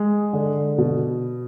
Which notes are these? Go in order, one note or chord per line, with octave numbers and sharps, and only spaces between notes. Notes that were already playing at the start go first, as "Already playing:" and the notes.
Already playing: G#3
D3
B2